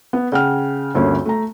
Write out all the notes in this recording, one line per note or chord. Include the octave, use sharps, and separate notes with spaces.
B3
C#3 F#5 G5 F6
G1 D2 A#3 C#4
A3 A#5